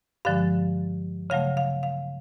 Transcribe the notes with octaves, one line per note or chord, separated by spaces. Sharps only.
G2 D3 F3 G#3 F5
C#3 F#3 A3 F5
F5
F5